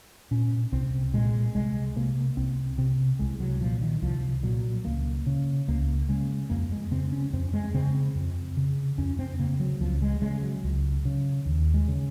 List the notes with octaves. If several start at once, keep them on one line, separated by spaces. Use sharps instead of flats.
A#2 C#4
C2 C4
A#2 G#3
C2 G#3
C3 A#3
C2 C4
C3 C4
C2 G#3
F#3
A#2 F3
D#3
C2 F3
A#2 F#3
C#2 A#3
C#3
C#2 A#3
C#3 G#3
F2 A#3
G#3
C#3 C4
C#4
F2 C4
G#3
C#3 C4
C4
F2
C#3
F2 C#4
C4
C#3 A#3
F#3
C#2 F3
G#3
C#3 G#3
F#3
C#2
C#3
D#2
G#3
C#3